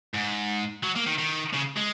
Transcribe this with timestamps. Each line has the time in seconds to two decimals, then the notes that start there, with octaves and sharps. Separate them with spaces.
0.15 G#2
0.83 F#3
0.96 A#3
1.06 D#3
1.18 D#3
1.53 C#3
1.76 G#3